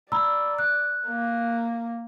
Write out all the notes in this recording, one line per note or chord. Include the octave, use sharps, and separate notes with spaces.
D5 A#5 B5 E6
F#6
A#3